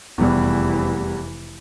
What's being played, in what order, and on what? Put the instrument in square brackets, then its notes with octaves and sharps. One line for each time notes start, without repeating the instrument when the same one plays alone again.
[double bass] F1 E3 [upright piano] E2 G3